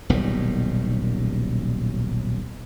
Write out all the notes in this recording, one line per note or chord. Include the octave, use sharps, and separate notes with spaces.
D#1 B1 A2 G3